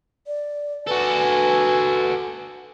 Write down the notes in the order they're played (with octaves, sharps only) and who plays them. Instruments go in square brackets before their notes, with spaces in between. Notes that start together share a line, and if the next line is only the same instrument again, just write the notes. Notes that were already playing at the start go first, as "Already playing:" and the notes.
[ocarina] D5
[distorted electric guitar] F#4 A4 [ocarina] B4 [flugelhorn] G#5